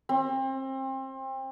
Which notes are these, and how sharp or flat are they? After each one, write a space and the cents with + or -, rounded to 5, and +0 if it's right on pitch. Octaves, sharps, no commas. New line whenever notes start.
C4 +30